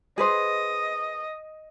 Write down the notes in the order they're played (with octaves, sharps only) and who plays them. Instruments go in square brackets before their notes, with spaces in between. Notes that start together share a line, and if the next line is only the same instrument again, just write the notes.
[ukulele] G#4 B4 C5 [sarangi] D#5